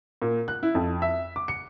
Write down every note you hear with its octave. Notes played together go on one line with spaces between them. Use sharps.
A#2
F#6
E4
F2
E5
D6
C#7